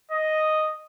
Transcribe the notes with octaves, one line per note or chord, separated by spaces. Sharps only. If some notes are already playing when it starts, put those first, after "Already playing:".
D#5